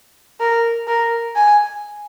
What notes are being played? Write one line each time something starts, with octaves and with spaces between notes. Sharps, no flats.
A#4
A#4
G#5